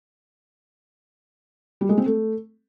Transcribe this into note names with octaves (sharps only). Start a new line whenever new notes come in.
G3
G#3
C4
A3